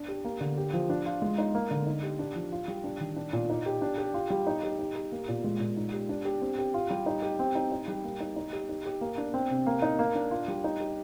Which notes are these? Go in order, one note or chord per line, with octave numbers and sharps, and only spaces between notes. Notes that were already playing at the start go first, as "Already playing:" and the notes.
Already playing: D4
G4
A#3
D3
G4
F3
D4
F4
G#3
D#4
A#3
D3
D#4
G4
D4
F3
F4
G3
D4
D#3
D4
A#2
D#4
G4
D4
G4
F4
G3
D#4
G4
D#4
G4
A#3
A#2
G#3
A#2
D#4
G4
D4
G4
C4
G4
F4
G3
D#4
G4
C4
D#4
D#4
G3
A#3
D#4
D#4
G4
D#4
G4
A#3
D4
C4
C3
A#3
D#4
A#3
D4
F4
G3
D#4
G4